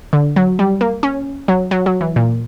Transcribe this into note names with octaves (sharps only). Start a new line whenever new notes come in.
D3
F#3
G3
A#3
C#4
F#3
F#3
F#3
E3
A#2